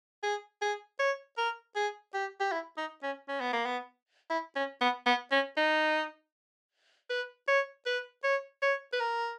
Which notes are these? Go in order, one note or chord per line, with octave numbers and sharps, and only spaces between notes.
G#4
G#4
C#5
A#4
G#4
G4
G4
E4
D#4
C#4
C#4
B3
A#3
B3
E4
C#4
B3
B3
C#4
D#4
B4
C#5
B4
C#5
C#5
B4
A#4